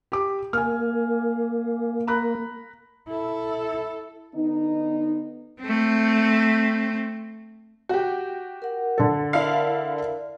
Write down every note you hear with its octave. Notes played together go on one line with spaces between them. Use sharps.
G4 D6
A#3 G#5 F6
A#5 B5 F#6
E4 A4
D3 B3 D#4
A3 C4
F#4 G4
A#4 F#5
D3 A4
E4 A#4 D5 F5